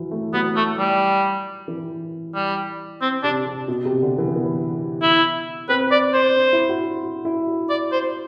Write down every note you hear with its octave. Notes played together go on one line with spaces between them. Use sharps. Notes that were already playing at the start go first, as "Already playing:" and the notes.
Already playing: E3 F#3
A3
F#3 B3
A3
G3
E3
G3
C4
C3 D4
C3
B2
C3
D3
E3
B3
E4
C4 B4
D5
C5
D4
E4
F#4
F#4
E4
F#4
D5
C5